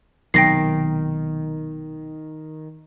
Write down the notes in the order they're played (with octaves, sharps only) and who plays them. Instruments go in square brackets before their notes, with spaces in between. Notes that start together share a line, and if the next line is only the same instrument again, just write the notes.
[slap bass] B1 C3 [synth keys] D#3 [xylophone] G5 A#6 C7